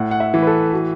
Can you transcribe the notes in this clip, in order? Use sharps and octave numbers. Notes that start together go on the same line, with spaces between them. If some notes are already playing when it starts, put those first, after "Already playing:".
Already playing: A2 F#5
F#5
E5
E3
B4
A4
F#4